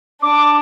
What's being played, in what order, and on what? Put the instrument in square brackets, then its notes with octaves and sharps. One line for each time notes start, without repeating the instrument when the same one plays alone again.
[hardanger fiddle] D4 [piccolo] D6